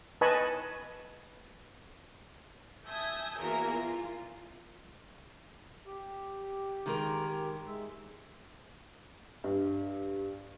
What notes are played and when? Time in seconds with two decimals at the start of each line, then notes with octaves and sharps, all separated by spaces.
0.21 B4 D#5 G#5 A5 B5 C#6
2.88 E5 G#5 A5 D#6 G6 G#6
3.39 E2 A#3 F#4 A#4 E5 G#5
3.72 F4
5.87 G4
6.86 D#3 G#3 A#4
7.67 G#3 E5
9.44 G2